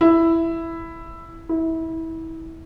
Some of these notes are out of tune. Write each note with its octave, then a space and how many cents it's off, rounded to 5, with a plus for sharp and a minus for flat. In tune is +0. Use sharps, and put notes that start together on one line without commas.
E4 +5
E4 -25